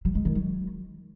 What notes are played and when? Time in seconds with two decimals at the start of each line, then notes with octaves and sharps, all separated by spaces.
0.05 F#3
0.15 G#3
0.25 D#3
0.35 F#3